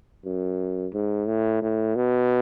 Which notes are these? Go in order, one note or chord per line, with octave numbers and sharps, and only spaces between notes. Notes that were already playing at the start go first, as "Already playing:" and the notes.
F#2
G#2
A2
A2
B2